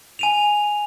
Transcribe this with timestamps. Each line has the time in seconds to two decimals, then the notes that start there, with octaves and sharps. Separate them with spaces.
0.19 G#5 D#7 F7